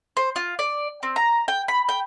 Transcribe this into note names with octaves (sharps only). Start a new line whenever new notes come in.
C5
F4
D5
C4
A#5
G5
B5
G5